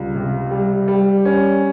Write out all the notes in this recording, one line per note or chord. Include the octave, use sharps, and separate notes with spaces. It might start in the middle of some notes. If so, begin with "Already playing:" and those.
Already playing: C#2 G3
C3
G3
G3
C#4